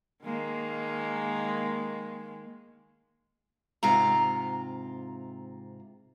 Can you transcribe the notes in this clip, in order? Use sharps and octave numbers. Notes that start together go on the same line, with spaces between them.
D#3 G#3 A#3
G#2 C3 F4 A#5